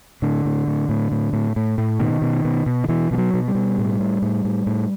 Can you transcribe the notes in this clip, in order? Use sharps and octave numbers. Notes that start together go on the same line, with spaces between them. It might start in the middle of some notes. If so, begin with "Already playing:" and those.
A2 D3
A2
A2
A2
A2
A2
A2
A2
B2 D#3
B2
B2
B2
D#3
B2 E3
B2 F3
F#3
B2
G3
B2
A2
A2
A2
A2
A2